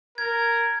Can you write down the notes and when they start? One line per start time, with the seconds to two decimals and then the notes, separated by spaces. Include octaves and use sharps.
0.18 A#4 G#6